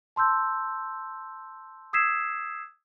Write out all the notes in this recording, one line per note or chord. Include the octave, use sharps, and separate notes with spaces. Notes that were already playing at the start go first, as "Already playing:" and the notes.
A5 C6 E6 G6
D#6 E6 G#6 B6 C7 E7